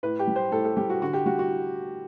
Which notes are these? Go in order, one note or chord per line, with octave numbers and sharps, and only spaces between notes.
A2 B4
G4
G3
C5
A2 A4
A4
G3 G4
F#4
D3 F#4
G4
G3 F#4
F#4